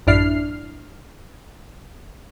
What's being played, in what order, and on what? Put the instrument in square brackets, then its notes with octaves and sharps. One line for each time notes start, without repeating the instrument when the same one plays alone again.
[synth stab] A1 F#2 D4 E4 F6 C7